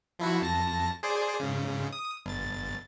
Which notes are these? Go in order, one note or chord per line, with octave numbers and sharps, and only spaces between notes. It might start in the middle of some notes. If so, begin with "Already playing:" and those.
F3 E4 F#4
F2 A5 A#6
G#4 C5 D5
G#2 C#3
D#6
G1 A6